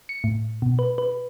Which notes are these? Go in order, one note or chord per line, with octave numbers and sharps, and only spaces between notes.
C#7
A2
B2
B4
B4